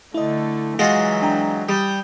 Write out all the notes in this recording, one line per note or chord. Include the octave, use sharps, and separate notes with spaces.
D3 A3 E4 D#5
E3 F#3 G#3 F4 F#4
D4 G5 A#5
G3 D#6 G6